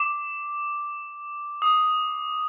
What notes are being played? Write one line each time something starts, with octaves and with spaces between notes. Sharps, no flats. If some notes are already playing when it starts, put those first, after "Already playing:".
Already playing: D6
D#6